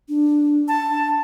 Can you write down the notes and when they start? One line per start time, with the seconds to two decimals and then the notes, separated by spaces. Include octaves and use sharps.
0.09 D4
0.68 A5